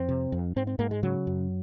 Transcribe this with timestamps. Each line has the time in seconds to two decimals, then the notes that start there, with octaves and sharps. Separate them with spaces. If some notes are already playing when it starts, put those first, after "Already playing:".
Already playing: F2 C4
0.09 C3
0.32 F2
0.56 G#2 C4
0.67 C4
0.79 G#2 A#3
0.91 G#3
1.03 C#3 F#3
1.27 F#2